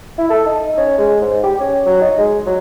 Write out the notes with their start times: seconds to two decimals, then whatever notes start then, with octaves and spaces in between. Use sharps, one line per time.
0.18 E4
0.30 A4
0.46 D#4
0.78 C#4
0.98 G#3
1.22 G#2
1.43 G4
1.60 C#4
1.86 F#3
2.02 D#4
2.18 G#3
2.47 F#3